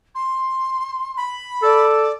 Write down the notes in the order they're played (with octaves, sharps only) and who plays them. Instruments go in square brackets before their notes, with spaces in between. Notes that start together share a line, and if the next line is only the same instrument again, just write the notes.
[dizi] C6
[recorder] B5
[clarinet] A4 [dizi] D5